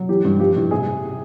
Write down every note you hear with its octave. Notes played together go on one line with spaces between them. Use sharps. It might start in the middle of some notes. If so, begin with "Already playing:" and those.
Already playing: F#3
E3 G4
G2
F3 G4
A2
C3 G#4